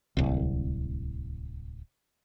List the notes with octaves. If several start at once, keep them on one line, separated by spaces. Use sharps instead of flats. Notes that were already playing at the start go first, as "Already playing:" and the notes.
D1 C2